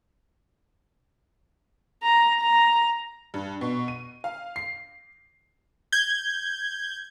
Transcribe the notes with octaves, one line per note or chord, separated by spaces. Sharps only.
A#5
A#5
G2
B2
D#7
F5
C7
G6 G#6